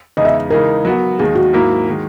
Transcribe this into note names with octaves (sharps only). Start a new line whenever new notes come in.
E2 C#3 G#3 D#4 G#4 D#5
E5
C#3 E3 G#3 D#4 G#4 A#4
F#3 B3 F#4
D#2 D#3 G#3 G#4
F#4
G#2 F#3 A#3 E4 A#4
D#3 G#3